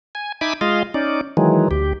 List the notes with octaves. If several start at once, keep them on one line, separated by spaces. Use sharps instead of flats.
G#5
D#4 E5 G#5 B5 D6
G#3 F4 D#5 F5
C#4 D#4 D5
D#3 E3 F#3 G#3
D2 G4